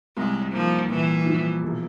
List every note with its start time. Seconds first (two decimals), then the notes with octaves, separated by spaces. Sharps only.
0.17 C2 G#3
0.53 F3 A#3
0.89 A#2 E3
1.26 F3
1.62 E1